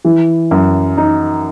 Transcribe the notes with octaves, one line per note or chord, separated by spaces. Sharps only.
E3
F#2
D#4